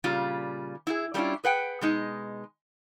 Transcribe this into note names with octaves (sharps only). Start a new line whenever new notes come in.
A#2 C#3 G3 F4
E4 F4 G#4
G3 A3 C#4 D4 E4 F4
G#4 B4 F#5 G5
B2 G#3 D#4